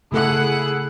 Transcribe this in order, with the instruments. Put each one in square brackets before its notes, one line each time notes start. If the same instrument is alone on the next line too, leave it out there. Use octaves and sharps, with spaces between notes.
[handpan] C#3 A3 A4 [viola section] E4 G#4 F#5